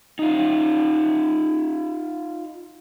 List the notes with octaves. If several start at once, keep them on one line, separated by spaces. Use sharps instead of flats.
D#4 F4